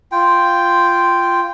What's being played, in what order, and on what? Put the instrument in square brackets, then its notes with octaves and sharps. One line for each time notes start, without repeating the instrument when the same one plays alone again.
[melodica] F4 G5